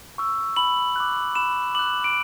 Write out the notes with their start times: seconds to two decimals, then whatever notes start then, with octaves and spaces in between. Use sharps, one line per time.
0.18 C#6 E6
0.56 B5 F#7
0.96 D6 F#6
1.35 B5 E7
1.74 D6 F#6 F#7
2.04 D7